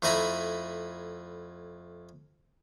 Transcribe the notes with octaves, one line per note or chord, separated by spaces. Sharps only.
F2 A3 E4 G#5 A#5 B5